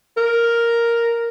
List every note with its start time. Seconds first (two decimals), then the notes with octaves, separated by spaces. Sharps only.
0.17 A#4